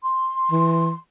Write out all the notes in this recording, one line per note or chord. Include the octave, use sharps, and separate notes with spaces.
C6
E3